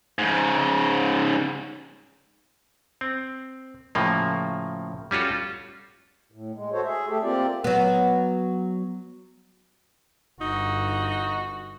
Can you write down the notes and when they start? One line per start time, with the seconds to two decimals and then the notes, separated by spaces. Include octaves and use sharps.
0.19 G#2 C#3
3.01 C4
3.95 A2 C#3 F3 A#3
5.11 G3 C#4 F4 F#4 A4
6.32 A2
6.55 G#3
6.72 F#4 A4 C5 C#5
6.84 G#4 E5
7.08 A3 G4 A4 E5
7.22 A#3 C4 F4 G4 D5
7.64 F#3 B3
10.41 G1 D#4 F#4